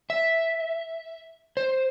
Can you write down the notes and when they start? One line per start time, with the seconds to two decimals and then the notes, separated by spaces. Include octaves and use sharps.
0.10 E5
1.57 C5